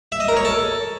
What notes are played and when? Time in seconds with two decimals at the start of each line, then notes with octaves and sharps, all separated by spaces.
0.12 E5
0.20 D#5
0.28 A#4
0.37 C#5
0.45 A4